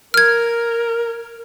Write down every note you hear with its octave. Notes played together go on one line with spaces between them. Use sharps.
A#4 F6 G#6